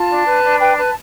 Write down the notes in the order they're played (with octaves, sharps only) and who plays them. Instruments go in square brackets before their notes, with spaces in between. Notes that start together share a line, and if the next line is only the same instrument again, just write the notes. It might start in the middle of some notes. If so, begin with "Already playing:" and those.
Already playing: [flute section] F4 A5
D4
B4
D4
B4 G5
B4 A5